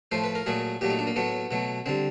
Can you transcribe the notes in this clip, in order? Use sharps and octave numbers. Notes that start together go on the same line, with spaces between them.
A2 F3 A3 C5
B4
A#4
A#2 F#3 A3 G#4
A#2 F#3 A3 G4
D#4
D4
A#3
A2 F#3 A3 B3
B2 F#3 A3
D3 G3 C4